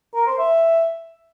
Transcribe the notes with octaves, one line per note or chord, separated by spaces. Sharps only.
A#4
C5
E5